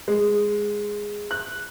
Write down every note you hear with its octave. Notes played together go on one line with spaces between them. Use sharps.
G#3
F#6